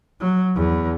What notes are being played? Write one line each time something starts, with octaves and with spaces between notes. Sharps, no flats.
F#3
E2